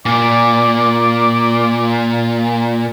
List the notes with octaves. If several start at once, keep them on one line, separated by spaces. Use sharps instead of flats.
A#2 D5